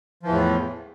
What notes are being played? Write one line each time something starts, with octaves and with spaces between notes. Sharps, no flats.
E2 A2 E3 F3